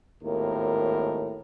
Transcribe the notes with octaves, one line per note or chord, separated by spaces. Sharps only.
G#1 D#2 A2 A#4